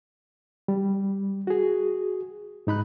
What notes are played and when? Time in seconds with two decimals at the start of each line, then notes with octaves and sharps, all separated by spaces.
0.68 G3
1.47 F#4 G#4
2.67 G#2 D#4 B5 F#6